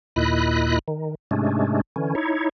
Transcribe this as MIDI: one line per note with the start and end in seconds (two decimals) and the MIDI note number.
0.16 0.79 39
0.16 0.79 46
0.16 0.79 64
0.16 0.79 75
0.16 0.79 83
0.16 0.79 90
0.88 1.15 51
1.31 1.81 44
1.31 1.81 48
1.31 1.81 56
1.31 1.81 57
1.31 1.81 61
1.31 1.81 62
1.96 2.15 50
1.96 2.15 52
1.96 2.15 61
2.15 2.49 63
2.15 2.49 64
2.15 2.49 73